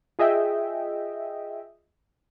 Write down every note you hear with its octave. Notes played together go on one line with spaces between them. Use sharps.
F4 G#4 D#5 E5 G5